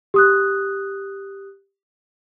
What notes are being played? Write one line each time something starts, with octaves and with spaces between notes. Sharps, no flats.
G4 D#6 F#6